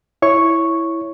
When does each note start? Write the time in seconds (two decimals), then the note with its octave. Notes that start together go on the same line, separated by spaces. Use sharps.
0.22 E4 C#5 C#6